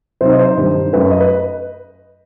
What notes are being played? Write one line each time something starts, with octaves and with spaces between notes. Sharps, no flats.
C3 F#3 C4 D#4 C5
D#5
C5
G2 D#3 G3 D#4
F#2 F#3 A3 B4
D#5
B4